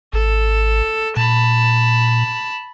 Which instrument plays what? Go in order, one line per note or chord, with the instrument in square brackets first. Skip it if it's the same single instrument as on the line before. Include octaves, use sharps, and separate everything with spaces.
[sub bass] G#1 [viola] A4
[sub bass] A#2 [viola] A5 B5